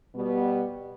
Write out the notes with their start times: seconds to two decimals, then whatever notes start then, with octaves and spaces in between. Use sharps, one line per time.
0.15 B2 G3 B3